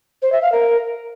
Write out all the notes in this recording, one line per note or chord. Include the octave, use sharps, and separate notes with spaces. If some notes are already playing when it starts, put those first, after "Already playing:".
C5
E5
F5
A#4